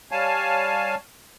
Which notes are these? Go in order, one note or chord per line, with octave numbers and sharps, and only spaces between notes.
G3 C#5 F5 G#5 A5